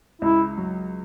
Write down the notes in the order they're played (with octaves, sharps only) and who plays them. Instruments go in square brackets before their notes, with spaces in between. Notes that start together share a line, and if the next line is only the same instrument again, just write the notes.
[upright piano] C#2 [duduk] E4
[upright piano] F#3